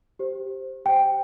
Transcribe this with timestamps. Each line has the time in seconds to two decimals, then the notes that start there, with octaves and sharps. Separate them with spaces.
0.19 G4 C5
0.85 G4 C5 G5